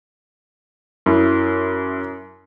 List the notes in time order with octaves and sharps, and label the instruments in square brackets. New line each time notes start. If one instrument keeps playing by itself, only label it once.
[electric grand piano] F#2 E4